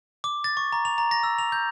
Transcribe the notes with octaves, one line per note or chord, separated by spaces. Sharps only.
D6
A6
C#6
A#5
F7
A#5
A#6
E6
F7
G6